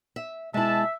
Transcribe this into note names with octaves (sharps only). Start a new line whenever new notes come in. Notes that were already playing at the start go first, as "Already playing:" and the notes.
E5
B2 G#3 E4 E5 A5